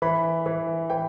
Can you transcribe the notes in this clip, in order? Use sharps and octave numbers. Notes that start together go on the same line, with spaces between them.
E3 B5
E3
E3 G5